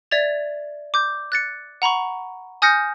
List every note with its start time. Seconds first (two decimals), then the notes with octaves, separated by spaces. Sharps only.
0.11 D5 E5 G#6 A6 F7
0.94 D6 G6
1.32 F#6 A6 C#7
1.82 F#5 A#5 B5 C#6
2.62 G#5 D#6 F6 G6 A#6 C#7